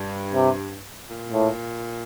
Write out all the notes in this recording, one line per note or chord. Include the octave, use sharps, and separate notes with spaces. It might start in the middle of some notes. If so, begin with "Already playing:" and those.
Already playing: G2
C3
A#2
A2